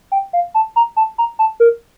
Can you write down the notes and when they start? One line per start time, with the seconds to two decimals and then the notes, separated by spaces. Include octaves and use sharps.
0.12 G5
0.33 F5
0.54 A5
0.76 A#5
0.97 A5
1.18 A#5
1.39 A5
1.60 A#4